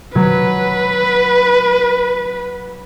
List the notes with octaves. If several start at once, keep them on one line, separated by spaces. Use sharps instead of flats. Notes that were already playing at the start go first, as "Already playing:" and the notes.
F#3 B4